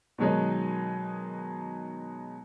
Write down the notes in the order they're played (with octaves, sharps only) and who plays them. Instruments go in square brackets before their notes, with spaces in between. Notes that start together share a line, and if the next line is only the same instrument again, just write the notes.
[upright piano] B2 D#3 F#3 G#3 D#4